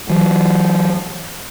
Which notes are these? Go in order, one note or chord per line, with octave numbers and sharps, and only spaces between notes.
E3 F#3